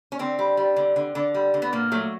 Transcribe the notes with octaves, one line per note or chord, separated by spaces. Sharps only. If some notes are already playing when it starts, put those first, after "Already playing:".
C#4
D3 C4
G3
G3
D3
D3
D3
G3
D3
B3
A#2 A#3
F#3 A3